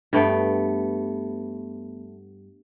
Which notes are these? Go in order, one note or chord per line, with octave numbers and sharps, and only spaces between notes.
G2 A3 B3 G5